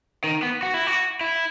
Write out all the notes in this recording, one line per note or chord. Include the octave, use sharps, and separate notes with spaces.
D#3
B3
F#4
E4
F#4
E4